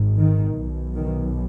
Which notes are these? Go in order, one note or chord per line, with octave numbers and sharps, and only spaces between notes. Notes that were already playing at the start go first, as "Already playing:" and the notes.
Already playing: G#1 G#2
D#3
B1 B2
D#3